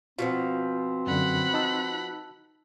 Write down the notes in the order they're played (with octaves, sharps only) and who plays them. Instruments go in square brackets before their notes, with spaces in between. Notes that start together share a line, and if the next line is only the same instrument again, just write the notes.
[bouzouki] B2 D#3 F3 [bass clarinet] C4 [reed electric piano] F4
[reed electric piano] F#2 D3 [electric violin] F#5 B5
[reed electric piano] D#4 A5 E6